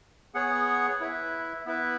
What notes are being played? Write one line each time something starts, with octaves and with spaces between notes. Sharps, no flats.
B3 G#4 C#5 F#5
E4 B4 E5
B3 E4 B4 E5